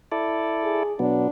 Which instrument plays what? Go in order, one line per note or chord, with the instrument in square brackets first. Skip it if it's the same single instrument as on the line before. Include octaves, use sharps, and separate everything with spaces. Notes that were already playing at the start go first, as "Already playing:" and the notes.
[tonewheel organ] E4 A4 D5
[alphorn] G#4
[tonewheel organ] B2 F#3 B3 [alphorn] D4